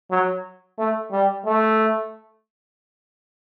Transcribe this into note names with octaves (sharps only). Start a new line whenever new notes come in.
F#3
A3
G3
A3